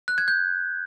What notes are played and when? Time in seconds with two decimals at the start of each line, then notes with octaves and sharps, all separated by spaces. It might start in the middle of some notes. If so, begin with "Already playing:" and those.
0.08 F#6
0.18 G#6
0.28 G6